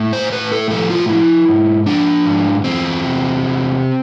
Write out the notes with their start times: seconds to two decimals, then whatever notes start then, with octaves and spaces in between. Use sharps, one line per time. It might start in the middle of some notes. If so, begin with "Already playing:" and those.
Already playing: A2
0.13 C5
0.32 A2 B4
0.52 A4
0.71 F3 A4
0.90 F4
1.09 F3 E4
1.48 G#2
1.86 F3 D4
2.25 G#2
2.64 E2 C4
3.03 C3
3.41 E2